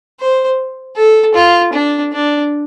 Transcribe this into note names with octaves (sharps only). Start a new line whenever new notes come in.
C5
A4
F4
D4
D4